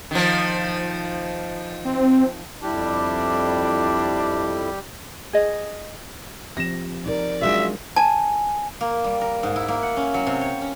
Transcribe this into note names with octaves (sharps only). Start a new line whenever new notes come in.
D#3 F3
C4
F2 G3 D4 E4 G4
G#4 D#5
F3 C4 G4 A#6 E7
D#4 A#4 D5
F#3 G#3 D4 F4 F#4 G#4 E5
G#5 A5
A#3
G3
A#4
G#2
E4
A#3
F#5
C#4
F#3
C3
C#5
C#4